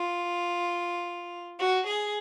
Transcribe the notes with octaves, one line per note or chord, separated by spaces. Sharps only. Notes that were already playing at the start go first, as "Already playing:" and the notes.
Already playing: F4
F#4
G#4